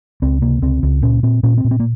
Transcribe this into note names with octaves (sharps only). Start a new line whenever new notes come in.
C#2 C4
C3 A#3
C#2 C4
C#2
A#2 C#4
A#2 C4
A#2 C#4
C4
A#2
C4
A#3